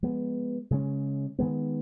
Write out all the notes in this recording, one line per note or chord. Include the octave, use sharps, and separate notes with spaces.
F3 G#3 B3
C#3 G#3 C#4
D#3 G#3 B3